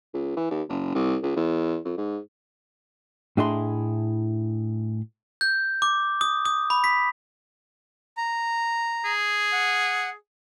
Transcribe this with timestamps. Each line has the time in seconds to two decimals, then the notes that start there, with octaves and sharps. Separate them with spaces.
0.14 C#2
0.37 E3
0.51 D#2
0.69 F#1
0.95 C2
1.23 C#2
1.36 E2
1.85 F2
1.98 G#2
3.37 A2 D4 E4 G#4 D#5 C6
5.41 G6
5.82 D6
6.21 D#6
6.45 D#6
6.70 B5
6.84 B6
8.17 A#5
9.05 G#4
9.53 F#5